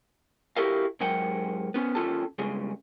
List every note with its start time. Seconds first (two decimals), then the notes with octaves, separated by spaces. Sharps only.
0.56 E4 F#4 G4 A4 A#4 F5
1.00 G#2 F#3 A#4 F#5 G5
1.74 B3 C#4
1.95 D#2 F#3 C#4 F4 A4 A5
2.39 G2 C#3 G#3